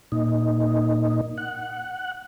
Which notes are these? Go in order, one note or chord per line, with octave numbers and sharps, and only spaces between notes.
A#2 D#4
F#5